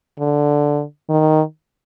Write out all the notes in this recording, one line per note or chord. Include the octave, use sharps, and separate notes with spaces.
D3
D#3